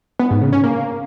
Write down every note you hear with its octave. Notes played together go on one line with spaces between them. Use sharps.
B3
G#2
C#3
C#4
A#3